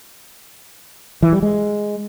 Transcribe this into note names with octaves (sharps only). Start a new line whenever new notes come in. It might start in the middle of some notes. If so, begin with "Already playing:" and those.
E3
G3
G#3